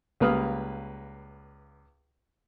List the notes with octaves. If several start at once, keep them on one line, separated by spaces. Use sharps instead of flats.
C#2 G3 A#3 B4 D#6 F6